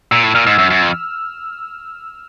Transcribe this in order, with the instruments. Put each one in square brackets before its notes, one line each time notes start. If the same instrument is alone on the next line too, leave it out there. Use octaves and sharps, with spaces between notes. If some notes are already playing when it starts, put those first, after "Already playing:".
[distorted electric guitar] A#2 [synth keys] E6
[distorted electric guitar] A2 [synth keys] E6
[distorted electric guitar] A#2 [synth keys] F6
[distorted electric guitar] G#2 [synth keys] E6
[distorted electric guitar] F#2
F#2
F2